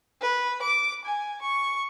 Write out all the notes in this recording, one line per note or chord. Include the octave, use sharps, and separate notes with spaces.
B4
D6
G#5
C#6